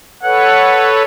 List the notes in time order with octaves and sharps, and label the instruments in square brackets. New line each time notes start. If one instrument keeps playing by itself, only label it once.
[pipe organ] A4 B4 C#5 [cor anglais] F#5